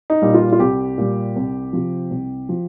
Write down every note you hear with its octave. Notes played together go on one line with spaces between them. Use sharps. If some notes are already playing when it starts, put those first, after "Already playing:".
D#4
A#2 G3
F4
F4
C2 G4
A#2 G3
C2
C3 F3
C2
F3